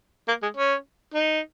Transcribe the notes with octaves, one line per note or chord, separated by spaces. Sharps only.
A#3
G#3
C#4
D#4